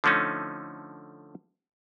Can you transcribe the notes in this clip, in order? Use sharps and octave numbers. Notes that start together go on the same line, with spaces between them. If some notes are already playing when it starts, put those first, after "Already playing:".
D3 F3 A3 C#4 D#4